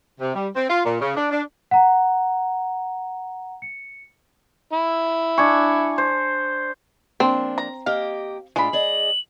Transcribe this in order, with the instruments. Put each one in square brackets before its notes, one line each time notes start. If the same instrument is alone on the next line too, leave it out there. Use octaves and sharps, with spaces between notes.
[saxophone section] C3
G3
C4
F4
A#2
C#3
D4
D4
[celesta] F#5 A#5
C#7
[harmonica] E4
[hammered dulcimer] D4 G#5 C#6
C5
[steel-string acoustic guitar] F3 A#3 D4 [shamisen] C4
[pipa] A#5
[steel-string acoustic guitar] A#3 G4 D#5 [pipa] F5
[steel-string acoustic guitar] A2 D4 F4 [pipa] G#3 B5
[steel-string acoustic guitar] G#4 D5 D#5 [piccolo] F#7